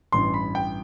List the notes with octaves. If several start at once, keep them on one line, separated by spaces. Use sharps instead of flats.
A1 G2 E3 C6
B5
G5